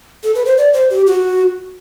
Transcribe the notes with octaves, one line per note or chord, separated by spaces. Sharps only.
A4
B4
C5
D5
C5
G4
F#4